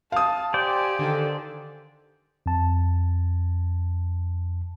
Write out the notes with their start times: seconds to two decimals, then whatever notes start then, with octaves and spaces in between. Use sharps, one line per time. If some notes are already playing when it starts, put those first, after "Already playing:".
0.12 F5 A5 D#6
0.54 G4 C5 D5 G5 G#5
0.99 D3 D#3 A4
2.46 F2 A5